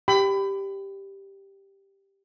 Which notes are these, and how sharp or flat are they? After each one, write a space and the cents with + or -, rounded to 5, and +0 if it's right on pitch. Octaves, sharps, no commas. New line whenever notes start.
G4 +0 G5 +0 B5 +30